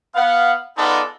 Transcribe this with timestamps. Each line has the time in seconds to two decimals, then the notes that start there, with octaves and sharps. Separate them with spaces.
0.16 B3 F5 F#5
0.78 G#3 B3 D#4 F4 A4 D5